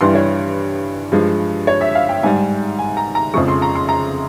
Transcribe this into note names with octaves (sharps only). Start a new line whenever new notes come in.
G2 E3 G3 C6
C#5
G2 F3 G#3
C#5
E5
F5
G5
G#2 G3 G#5
G#5
A#5
A#5
F2 C#3 F3 G#3 C#6
C6
A#5
C6
A#5